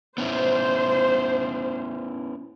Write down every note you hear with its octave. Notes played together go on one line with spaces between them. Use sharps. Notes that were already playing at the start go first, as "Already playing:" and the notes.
B3 C#4 E4 C5